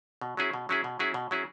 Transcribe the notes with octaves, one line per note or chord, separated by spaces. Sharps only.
B2
F#3 C#4 E4 G#4
B2
F#3 C#4 E4 G#4
B2
F#3 C#4 E4 G#4
B2
F#3 C#4 E4 G#4